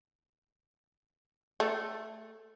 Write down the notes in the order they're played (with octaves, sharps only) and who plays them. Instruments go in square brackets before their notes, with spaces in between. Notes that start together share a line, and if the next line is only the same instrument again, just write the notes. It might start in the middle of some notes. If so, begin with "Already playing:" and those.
[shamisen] A3